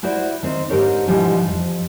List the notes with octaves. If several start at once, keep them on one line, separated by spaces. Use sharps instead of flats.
E4 F#4 C5 D5
D#3 C4
G#2 D3 G4 A#4 C5 C#5
G#2 B2 D3 E3 F3 G3
F2